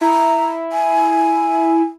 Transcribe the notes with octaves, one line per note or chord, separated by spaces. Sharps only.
E4 A#5
G#5